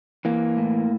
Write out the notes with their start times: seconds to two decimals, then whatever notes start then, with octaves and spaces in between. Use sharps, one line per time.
0.25 E3 A#3
0.57 A2